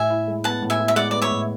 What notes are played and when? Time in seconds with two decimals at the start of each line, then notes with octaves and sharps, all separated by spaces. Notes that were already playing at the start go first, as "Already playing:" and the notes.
Already playing: A2 E5 G#5
0.10 E4
0.28 G#3
0.44 B3 F#5 A5
0.62 A2
0.70 E5 G#5
0.79 E4
0.88 E5
0.96 G#3 D5 F#5
1.11 B3 D5
1.22 C#5 E5
1.31 A2